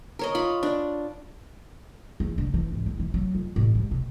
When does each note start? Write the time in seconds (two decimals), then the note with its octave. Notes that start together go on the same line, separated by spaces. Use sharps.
0.19 A#4 C#5 D#5
0.35 F4 B5
0.63 D4
2.20 E2
2.38 D3
2.54 E3
2.71 G#1
2.86 E2
3.00 E3
3.14 F#3
3.35 F2
3.56 A1
3.75 G#2
3.91 B2